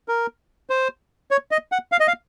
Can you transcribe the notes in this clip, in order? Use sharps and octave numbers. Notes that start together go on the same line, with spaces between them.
A#4
C5
C#5
D#5
F#5
F5
D#5
F5